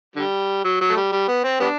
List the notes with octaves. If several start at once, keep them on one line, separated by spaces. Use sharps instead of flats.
D3 G3
F#3
F#3
A3
G3
G3
B3
C4
G3 B3 D4